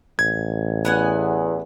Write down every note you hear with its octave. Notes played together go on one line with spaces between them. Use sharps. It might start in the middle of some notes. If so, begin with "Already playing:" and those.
A1 G#6
E2 B3 F#5 G#5